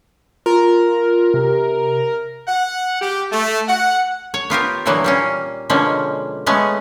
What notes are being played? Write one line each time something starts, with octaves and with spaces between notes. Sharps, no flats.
F4 A#4
C3
F#5
G4
A3
F#5
C#5
B3 F4 G4 A#4
A#2 D3 E3 F#3 A#3 B3
G3 A#3 C#4
B2 D3 F3 G#3 A#3 C#4
G#3 A3 B3 C#4